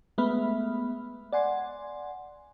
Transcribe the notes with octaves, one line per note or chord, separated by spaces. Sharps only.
G#3 A3 B3 E5 B5 F6
D5 F#5 G#5 C6